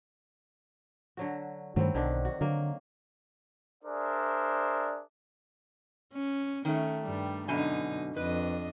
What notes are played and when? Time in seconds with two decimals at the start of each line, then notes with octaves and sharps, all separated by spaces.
1.17 D3 F#3 F#4
1.76 G2 D#3 F#3 A3 C4 E4
1.95 B1 D3 D#3 D4
2.25 F#4
2.41 D3 F#3 A#3
3.84 D4 G#4 A#4 C5 D5 E5
6.13 C#4
6.65 D#3 A3 C#4
7.05 G2 G3
7.48 F#2 B2 D3 D#4 G#5
8.16 F2 D4 B4 D#5